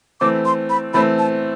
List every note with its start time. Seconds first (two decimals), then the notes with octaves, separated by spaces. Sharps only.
0.21 E3 A3 C4 D6
0.45 C6
0.70 B5
0.94 E3 A3 C4 B5
1.19 A5